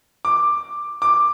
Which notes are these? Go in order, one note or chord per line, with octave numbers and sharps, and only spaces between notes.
D6
D6